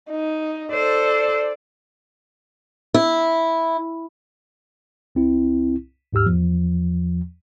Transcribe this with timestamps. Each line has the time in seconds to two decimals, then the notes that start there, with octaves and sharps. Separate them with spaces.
0.11 D#4
0.73 A4 C5 D5
2.94 E4
5.15 C2 C4 E4
6.13 D#2 G#2 G4 E6 F6
6.26 E2 F3